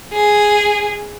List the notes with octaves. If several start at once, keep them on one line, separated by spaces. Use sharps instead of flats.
G#4